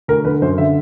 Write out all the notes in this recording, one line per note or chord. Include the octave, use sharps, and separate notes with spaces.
D2 A#4
D3 B4
F#2 C5
D3 E5